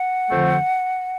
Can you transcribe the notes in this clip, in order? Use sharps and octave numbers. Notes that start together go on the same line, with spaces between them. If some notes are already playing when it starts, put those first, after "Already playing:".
Already playing: F#5
F2 D3 F3 A3 C4